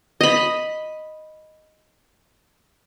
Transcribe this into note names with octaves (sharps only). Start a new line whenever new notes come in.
D#5 B5